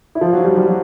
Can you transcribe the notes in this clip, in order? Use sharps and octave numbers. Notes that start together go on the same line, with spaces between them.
E4
F3 F4
F#3 F#4
G3 G4
G3 G4
F#3